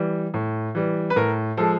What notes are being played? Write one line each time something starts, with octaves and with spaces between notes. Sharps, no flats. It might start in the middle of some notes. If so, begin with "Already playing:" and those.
Already playing: E3 G3
A2
E3 G3
B4
A2 A#4
F3 G#3 A4